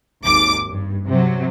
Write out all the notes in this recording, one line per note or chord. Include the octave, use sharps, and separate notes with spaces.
G#1 D#2 D6
G2
C3 F#3